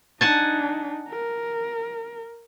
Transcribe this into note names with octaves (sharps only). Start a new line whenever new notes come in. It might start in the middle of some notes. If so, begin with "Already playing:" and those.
D4 D#4 F#5 G#5 A5
A#4